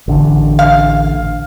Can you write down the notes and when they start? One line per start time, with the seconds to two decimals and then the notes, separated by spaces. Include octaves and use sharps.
0.08 A1 D3
0.59 F5